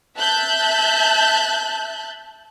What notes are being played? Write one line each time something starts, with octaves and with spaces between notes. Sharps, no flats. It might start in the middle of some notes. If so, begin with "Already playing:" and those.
E5 A5 F#6 G6